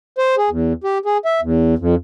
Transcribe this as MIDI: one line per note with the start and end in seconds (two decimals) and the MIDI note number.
0.18 0.35 72
0.37 0.49 68
0.50 0.73 40
0.84 0.98 67
1.06 1.18 68
1.25 1.40 76
1.42 1.74 40
1.79 1.95 41